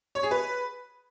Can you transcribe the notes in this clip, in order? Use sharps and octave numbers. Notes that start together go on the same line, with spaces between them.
C#5
G#4
B4